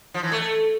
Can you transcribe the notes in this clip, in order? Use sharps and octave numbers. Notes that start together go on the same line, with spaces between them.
F3
E3
A3